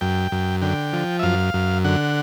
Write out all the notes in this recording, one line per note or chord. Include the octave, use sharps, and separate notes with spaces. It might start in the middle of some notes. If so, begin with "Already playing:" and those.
F#2 G5
F#2
D3 G5
F3
E5
F#2 F5
F#2
D3 F#5